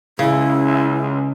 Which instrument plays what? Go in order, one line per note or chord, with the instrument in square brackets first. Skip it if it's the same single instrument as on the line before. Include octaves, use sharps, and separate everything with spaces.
[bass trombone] C#2 [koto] C#3 [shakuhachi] E4